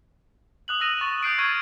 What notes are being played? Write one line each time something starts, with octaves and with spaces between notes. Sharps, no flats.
D#6 F#6 F#7
D#6 E6 A#6 D#7 E7 F#7
C#6 A6 D#7
D#6 G6 C7 D7
C#6 F6 G#6 A6 D#7